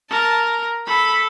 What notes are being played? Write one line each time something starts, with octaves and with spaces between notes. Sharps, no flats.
A#4 A5
A4 B5